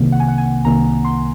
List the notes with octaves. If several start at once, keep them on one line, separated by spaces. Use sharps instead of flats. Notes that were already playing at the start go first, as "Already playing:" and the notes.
Already playing: C2 C3 D#3 A#3
F#5
G#5
F#5
G#5
C2 C3 D#3 A#3 A#5
C6